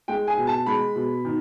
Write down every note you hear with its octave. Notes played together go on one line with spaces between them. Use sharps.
G#3 G5
G#5
B2
A5
G#3 B5
B2
D#3